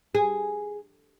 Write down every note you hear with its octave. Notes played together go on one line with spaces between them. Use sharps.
G#4